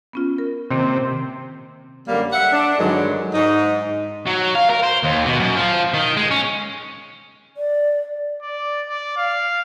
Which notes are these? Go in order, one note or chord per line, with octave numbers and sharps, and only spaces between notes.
B3 C#4 F4
A#4
C3 D#3 A#3 C4
F#2 D3 G3 A#3
E5 F#5
D4
G2 D3 D#3 F#3 G#3
G#2 D#4
F#3
F5
A#4
C5
D#2
B2
F#2
F3
D#3
G#3
C#4
D5
D5
D5
F5